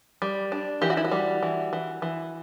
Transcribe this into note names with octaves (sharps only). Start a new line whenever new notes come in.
G3
D4
E3 G4
F#4
E4
F#4
G3
E3
E3
E3